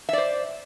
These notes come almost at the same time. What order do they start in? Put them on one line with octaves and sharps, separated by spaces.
E5 D5 C5